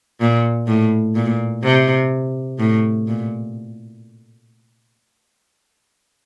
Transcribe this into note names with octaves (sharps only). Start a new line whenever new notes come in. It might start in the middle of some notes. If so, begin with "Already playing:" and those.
A#2
A2
A#2
C3
A2
A#2